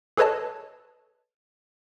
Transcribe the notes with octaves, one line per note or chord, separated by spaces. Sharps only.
G#4 A4 B4 C#5 D#5 A5